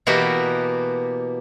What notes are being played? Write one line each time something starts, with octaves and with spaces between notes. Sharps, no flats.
B2 E3 A#3 B3 F#4 G4